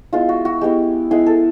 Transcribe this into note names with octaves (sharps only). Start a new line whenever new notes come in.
G#3 B3 E4 F4
F#4
F#4
G#3 B3 E4 G4
G#3 B3 E4 G#4
A4